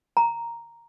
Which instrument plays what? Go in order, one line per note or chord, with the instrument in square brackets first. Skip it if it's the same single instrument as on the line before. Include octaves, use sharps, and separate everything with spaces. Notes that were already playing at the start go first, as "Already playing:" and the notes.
[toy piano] A#5